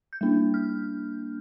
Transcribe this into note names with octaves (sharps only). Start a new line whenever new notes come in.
G6
G3 A#3 D4
F6